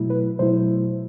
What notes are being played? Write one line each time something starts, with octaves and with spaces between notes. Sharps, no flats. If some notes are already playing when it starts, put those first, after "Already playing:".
Already playing: B2 F#3 A3 E4
B4
B2 F#3 A3 E4 C5